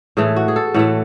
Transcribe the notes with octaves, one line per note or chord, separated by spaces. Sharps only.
A2 E3 A3 G#4
F#4
G#4
A4
A2 E3 A3 F#5